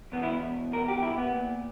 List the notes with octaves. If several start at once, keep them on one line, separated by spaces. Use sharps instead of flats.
E2 B2 B3
E4
A#4
G4
E4
B3
A#2